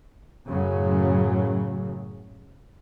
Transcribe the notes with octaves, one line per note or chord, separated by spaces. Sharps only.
F#2 A2 C#3 F#3